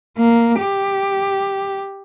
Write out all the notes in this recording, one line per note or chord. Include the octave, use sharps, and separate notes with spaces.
A#3
G4